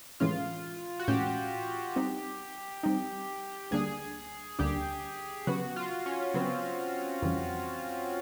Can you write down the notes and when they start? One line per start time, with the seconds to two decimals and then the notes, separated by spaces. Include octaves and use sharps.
0.20 A2 E3 G#3 C#4 F4
0.99 F#4
1.08 A2 E3 G#3 C#4 G4
1.96 G3 C4 D#4
2.83 G3 C4 D#4
3.71 D2 D3 G3 A#3 D4 G#4
4.59 D2 D3 G3 A#3 D4 G4
5.47 C#3 F#3 B3 F#4
5.76 F4
6.06 C#4
6.34 C#3 F#3 B3 C4
7.22 F2 C#3 E3 G3